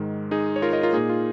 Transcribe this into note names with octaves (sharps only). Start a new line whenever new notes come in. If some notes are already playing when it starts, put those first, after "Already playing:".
Already playing: G#2 D#3 G#3
D#4 G#4
C#5
F4 A#4
A#4 D#5
F4 A#4
A#2 A#3 D#4 G#4
F4